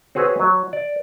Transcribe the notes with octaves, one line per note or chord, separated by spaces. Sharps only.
C4 F#4 G#4 B4 C#5
F#3
D5